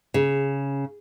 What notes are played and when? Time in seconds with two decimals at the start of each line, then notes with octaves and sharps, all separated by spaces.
0.14 C#3